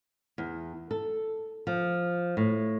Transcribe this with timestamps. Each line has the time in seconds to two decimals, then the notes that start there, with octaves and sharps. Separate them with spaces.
0.38 E2
0.91 A4
1.67 F3
2.37 A2